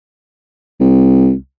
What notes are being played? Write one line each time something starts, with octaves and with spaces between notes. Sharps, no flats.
C2